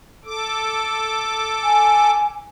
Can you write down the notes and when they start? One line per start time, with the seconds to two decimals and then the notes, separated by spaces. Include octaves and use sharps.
0.25 A4 D6
1.64 G#5